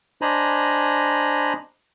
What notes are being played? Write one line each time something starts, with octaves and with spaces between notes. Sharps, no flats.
D4 C5 D#5 G#5 A#5 B5